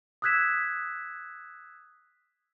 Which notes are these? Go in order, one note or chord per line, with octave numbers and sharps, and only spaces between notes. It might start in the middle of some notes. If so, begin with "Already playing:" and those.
D#6 E6 F#6 G#6 B6 E7